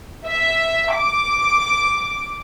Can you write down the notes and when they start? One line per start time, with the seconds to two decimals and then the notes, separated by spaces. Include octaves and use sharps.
0.26 E5
0.94 D6